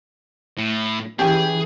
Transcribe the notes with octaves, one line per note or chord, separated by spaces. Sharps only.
A2
E3 C#4 G4 G#4 G5